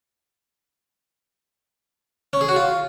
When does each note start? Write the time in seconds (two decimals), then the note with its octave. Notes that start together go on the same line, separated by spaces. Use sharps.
2.33 C#4
2.41 G#4
2.49 F#4
2.56 F4